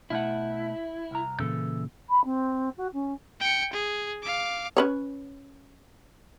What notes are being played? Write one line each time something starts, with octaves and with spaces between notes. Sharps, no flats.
B2 A3 E4 F#5
C2 A#5
A#2 C#3 E3 A4
B5
C4
F#4
C#4
G5 C#7
G#4
F5 D6
C#4 B4 C#5